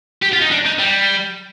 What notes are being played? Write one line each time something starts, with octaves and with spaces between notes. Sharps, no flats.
G4
F4
D#4
D4
D#4
G3